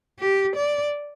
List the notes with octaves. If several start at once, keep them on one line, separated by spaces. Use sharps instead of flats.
G4
D5